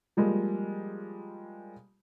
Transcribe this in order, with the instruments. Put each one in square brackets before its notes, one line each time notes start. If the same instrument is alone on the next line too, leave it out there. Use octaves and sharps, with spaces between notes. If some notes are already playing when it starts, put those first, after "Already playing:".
[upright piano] F3 G3 G#3 A#3